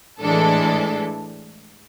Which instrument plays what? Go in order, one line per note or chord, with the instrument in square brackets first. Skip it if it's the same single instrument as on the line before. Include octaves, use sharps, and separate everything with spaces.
[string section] A2 E3 G#3 D4 A4